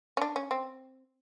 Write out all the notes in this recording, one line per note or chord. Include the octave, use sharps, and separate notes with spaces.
C#4
D4
C#4
C4